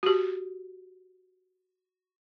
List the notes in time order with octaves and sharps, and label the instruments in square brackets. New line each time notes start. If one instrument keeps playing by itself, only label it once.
[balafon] F#4 G4